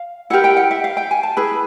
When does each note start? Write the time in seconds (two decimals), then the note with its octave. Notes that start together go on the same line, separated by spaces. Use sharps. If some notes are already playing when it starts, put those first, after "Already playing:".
Already playing: F5
0.30 E4 G4 A#4 F#5
0.44 G5
0.57 F#5
0.71 E5
0.84 F5
0.97 G5
1.11 G#5
1.23 A5
1.37 E4 G#4 B4